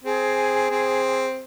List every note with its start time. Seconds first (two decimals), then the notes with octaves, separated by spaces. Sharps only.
0.04 C4 G#4
0.71 C4